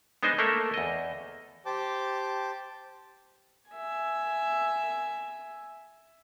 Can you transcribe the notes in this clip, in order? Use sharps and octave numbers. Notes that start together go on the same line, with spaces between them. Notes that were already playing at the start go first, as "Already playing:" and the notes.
G#3 B3 D4 D#4 C5 D#5
A3 A#3 A4 A#4 E5
E2 D#5
G4 C5 G5 A5 D6
E5 G#5